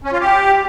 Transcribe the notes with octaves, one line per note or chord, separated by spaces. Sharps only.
C#4
F4
G4